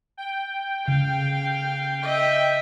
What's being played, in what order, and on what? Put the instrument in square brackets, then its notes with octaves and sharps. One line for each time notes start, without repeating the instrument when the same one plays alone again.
[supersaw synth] G5
[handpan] C#3 [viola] F5
[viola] D#5 E5